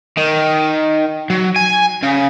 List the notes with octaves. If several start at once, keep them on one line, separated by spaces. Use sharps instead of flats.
D#3
F#3
G#5
C#3